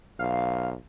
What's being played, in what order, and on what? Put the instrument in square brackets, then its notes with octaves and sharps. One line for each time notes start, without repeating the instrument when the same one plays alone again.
[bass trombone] B1 [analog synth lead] F5